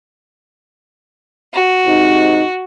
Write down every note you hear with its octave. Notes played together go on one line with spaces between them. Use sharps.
F#4
G#2 C3 D#4